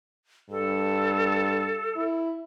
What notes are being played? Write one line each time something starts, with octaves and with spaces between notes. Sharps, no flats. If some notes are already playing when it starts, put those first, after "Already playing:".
G2 A4
E4